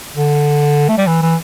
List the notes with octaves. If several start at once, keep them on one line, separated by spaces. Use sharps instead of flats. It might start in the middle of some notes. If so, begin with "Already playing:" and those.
D3
A3
G3
E3
E3